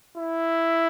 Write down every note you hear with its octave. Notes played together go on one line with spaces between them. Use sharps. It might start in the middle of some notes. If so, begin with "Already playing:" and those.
E4